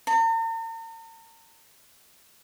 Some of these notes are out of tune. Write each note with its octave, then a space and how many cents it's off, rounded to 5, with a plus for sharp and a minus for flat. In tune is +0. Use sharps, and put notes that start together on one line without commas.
A#5 -45